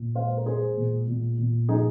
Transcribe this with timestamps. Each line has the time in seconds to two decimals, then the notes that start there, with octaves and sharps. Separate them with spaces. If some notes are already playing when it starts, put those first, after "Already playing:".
Already playing: A#2
0.15 G#3 C5 F5
0.37 A#4
0.46 G#3 G#4 C5
0.77 A#2
1.07 A#2
1.38 A#2
1.69 F3 D#4 G#4